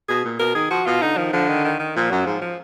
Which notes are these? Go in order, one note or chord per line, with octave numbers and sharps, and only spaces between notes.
B2 G#4
A#2
B2 A#4
D#3 G#4
F3 F#4
B2 F4
D3 D#4
D#3 F3
D3 F3
D#3
D#3
D#3
A#2 F3
F#2 F#3
G#2 F3
F3